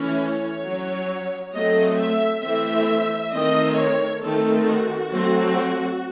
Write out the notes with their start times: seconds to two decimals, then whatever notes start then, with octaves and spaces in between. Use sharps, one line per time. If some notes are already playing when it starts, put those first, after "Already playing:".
Already playing: E3 A3 C#4
0.19 C#5
0.64 F#3 C#4
1.53 F#3 A3 C4 D#5
1.97 E5
2.42 E3 A3 C4 E5
3.32 D#3 A3 C4 D#5
3.77 C#5
4.21 D#3 A3 C4 A4
4.67 F#4
5.10 F#3 A3 C4